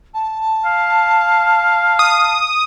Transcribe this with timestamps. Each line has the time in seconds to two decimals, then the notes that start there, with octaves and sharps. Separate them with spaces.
0.14 A5
0.65 F5
1.99 D#6